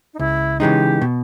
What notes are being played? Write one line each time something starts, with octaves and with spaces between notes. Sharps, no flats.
D#4
C#2 E4
C#3 E3 G#3 D#4 G4
B2